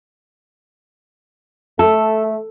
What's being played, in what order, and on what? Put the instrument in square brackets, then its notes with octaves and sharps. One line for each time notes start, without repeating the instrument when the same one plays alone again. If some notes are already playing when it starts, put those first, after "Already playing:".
[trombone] A3 [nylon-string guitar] A4